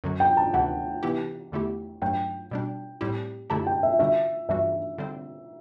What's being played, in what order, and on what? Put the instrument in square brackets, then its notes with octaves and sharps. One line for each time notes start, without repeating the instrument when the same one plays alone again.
[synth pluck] F#2 D3 F#3
[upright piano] G5
A5
[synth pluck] D2 C3 E3 [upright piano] F#5
[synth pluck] C3 E3 B3 E4 G4
E2 D3 A3 E4 G4
[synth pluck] G2 F#3 A3 D4 [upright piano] G5
[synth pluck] B2 G3 D4
A2 G3 C4 E4 G4
[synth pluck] F#2 D3 A3 E4 G4 [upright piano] A5
[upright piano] G5
E5
[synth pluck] D3 G3 D4 F#4 [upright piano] E5
[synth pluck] G2 E3 G3 D4 F#4 [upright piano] E5
[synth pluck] D3 G3 C4